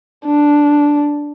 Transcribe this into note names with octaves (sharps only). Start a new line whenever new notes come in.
D4